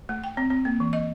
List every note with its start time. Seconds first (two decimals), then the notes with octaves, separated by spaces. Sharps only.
0.09 A3
0.24 G5
0.37 C4
0.50 C4
0.65 A#3
0.80 E3
0.93 D#5